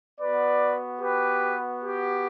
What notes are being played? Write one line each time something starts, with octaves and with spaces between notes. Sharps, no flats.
B3 F#4 B4 D5
G4 B4
G4